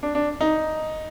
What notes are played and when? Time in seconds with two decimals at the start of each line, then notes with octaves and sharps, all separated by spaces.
0.03 D4
0.15 D4
0.41 D#4